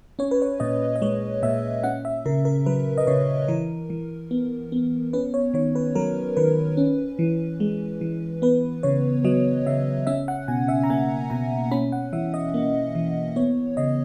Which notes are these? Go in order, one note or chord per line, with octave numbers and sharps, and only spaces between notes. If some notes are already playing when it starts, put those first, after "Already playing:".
C#4 C#5
B4
C#5
A#2 D#5
D#5
G#3 C#5
A#2 E5
C#4 F#5
E5
C#3 A#4
A#4
F#3 B4
D#5
C#3 C#5
E3 A#4
E3
B3
B3
C#4 B4
C#5
D#3 C#5
B4
F#3 A#4
D#3 B4
C#4
E3
G#3
E3
B3 B4
C#3 C#5
F#3 D#5
C#3 E5
C#4 E5
F#5
B2 G#5
E5
A#5
A#3 G#5
B2 A#5
C#4 B5
F#5
E3 E5
D#5
A#3
E3
B3 C#5
C#3 D#5